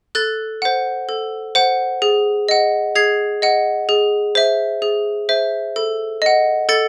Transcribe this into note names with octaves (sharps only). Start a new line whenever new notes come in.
A4 F#6 A6
C5 F#5
A4
C5 F#5
G#4
D#5 F#5
G#4 G#6 C7
D#5 F#5
G#4
C5 E5
G#4
C5 E5
A4
D#5 F#5
A4 A6 C#7